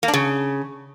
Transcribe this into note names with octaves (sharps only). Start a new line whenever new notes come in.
A#3
D4
C#3